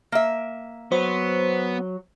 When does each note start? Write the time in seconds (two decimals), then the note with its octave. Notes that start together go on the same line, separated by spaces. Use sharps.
0.12 A#3 E5
0.92 F#3 B3 C5